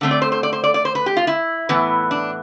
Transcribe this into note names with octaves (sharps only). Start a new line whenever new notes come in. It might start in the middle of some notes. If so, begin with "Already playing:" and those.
D3 A3 C4
D5
C5
C5
D5
C5
D5
D5
C5
B4
G4
F4
E4
A2 E3 B3
D4